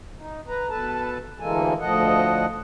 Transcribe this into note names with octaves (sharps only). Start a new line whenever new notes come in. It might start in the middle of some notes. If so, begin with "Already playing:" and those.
D#4
B4 A#5
B2 A4 B4 A5
D2 E3 G#3 A#3 A4 G#5
D2 A2 F3 A4 D#5 F#5